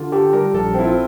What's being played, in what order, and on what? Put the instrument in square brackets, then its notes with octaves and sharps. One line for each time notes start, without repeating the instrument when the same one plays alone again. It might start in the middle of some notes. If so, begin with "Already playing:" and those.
Already playing: [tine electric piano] D3 [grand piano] F4
[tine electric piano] G4 [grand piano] A4
[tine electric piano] G3 [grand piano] A#4
[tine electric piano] A#1 [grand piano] A4
[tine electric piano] C4 [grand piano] E4
[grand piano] F4